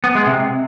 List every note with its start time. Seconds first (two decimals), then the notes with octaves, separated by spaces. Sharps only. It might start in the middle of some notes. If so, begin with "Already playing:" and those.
0.04 B3
0.15 G#3
0.27 C3